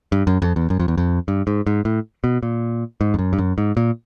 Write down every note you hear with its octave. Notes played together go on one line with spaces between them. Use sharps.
G2
F#2
F2
E2
F#2
F2
E2
F2
G2
G#2
G#2
A2
B2
A#2
G#2
F2
F#2
G2
F#2
G#2
A#2